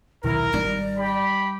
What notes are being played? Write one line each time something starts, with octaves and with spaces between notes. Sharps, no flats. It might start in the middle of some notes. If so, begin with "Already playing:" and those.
D#1 B1 D#3 E4 A#4
G#1 G3 D#4 D5
G4 B5